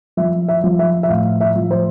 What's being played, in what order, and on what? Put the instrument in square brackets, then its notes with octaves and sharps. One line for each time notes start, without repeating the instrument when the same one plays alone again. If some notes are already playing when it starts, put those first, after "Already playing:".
[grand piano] F3 E5
E5
F3
E5
E5
A2 F5
E5
F3
C5